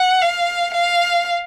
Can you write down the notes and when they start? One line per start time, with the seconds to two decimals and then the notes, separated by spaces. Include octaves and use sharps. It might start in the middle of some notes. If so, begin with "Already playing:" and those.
Already playing: F#5
0.22 F5
0.74 F5